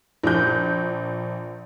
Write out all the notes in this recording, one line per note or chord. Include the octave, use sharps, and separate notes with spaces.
A#1 G6